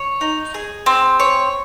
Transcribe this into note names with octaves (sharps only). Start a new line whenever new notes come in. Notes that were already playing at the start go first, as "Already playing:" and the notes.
Already playing: C#5
D#4
G#4
C4
C#5